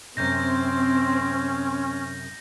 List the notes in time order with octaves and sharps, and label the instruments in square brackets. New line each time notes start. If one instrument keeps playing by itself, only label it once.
[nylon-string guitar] F#2 C3 [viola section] C4 [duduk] C#4 [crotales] G6 A#6